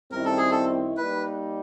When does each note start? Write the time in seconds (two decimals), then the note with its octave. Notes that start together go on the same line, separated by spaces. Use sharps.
0.11 F#2 D#3 G3 C4 E4 A#4
0.25 A4
0.37 G#4
0.51 A4
0.97 G3 A#3 D#4 B4